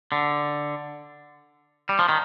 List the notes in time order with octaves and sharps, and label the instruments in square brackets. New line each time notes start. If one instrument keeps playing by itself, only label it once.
[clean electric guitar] D3
G3
F3
D#3